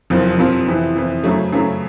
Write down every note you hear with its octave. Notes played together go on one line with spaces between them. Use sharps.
F#1 F2 C3 F3
F#1 F2 C3 F3
F2 C3 E3
F2 C3 E3
F#2 C#3 F#3 A3
F#2 C#3 F#3 A3